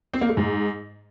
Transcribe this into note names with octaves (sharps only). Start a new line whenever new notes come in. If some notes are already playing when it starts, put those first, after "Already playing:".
C4
A#3
A3
G#2